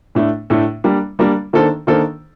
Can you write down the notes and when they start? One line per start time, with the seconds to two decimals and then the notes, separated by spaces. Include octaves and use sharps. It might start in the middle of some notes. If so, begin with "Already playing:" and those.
0.15 A2 A3 D4
0.50 A2 A3 D4
0.84 G3 A#3 D4
1.19 G3 A#3 D4
1.53 D#3 A#3 D4 A4 C5
1.87 D#3 A#3 D4 A4 C5